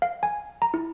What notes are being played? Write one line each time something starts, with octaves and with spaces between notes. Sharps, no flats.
F5
G#5
A#5
E4